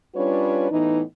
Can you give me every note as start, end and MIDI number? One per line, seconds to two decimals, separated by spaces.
0.15 0.70 55
0.15 0.70 61
0.15 0.70 62
0.15 0.70 65
0.15 0.70 71
0.15 0.70 73
0.71 1.02 45
0.71 1.02 52
0.71 1.02 59
0.71 1.02 63